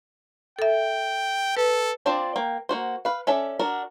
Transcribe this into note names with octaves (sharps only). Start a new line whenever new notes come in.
A4 E5 G5
A4 B4
C4 D4 F4 C5 D5
A#3 G5
A#3 F#4 C5
B4 F5
C#4 A4 D5 E5
D4 F#4 A#4